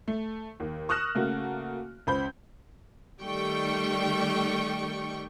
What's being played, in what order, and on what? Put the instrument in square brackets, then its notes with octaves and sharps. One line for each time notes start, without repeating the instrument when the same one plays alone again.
[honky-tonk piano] A3
D#2
C#6 D#6 F6 F#6 A#6 E7
C#3 A3 A#3 F#4
C#2 C5 B5 G6
[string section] D#3 G3 A3 G5 C#6